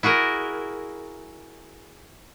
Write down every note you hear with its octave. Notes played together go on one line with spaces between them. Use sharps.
E4 F#4 G#4 A#4